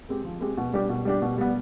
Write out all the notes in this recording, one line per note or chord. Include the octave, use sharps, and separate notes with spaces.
G#3 C4 G4
F3
G#3 C4 G4
B2
G3 D4 G4
B2
G3 D4 G4
B2
G3 B3